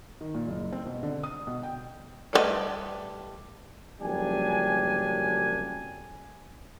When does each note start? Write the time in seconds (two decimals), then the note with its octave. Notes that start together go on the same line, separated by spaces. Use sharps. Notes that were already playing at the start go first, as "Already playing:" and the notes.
0.21 D#3
0.34 A#2
0.48 F#1
0.72 C4
0.86 B2
1.03 D3
1.23 D#6
1.47 B2
1.63 G5
2.33 G3 A3 D4 B4 D#5
4.01 F#1 F2 C#3 G3 D4 G#5